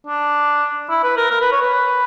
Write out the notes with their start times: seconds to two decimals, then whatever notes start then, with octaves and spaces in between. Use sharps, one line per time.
0.07 D4
0.90 E4
1.04 B4
1.17 A#4
1.30 A#4
1.41 B4
1.52 C#5
1.62 B4